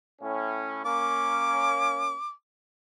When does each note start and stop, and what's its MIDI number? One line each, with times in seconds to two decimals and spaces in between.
0.22 0.82 45
0.22 0.82 61
0.86 2.16 58
0.86 2.16 61
0.86 2.32 86